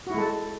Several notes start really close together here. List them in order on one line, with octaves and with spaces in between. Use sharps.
F#4 E4 G#3 A4